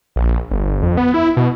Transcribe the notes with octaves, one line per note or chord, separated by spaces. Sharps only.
A#1
G1
G1
F2
B3
E4
B2